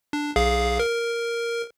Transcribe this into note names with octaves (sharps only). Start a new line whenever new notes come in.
D4
B1 G#4 F5
A#4